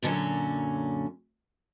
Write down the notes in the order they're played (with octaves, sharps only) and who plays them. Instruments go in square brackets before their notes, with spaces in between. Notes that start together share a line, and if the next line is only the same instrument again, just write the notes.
[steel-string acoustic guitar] F#2 A#2 D3 E3 F#3 C#4